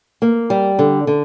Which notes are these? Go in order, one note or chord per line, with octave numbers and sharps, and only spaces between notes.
A#3
G3
D3
D3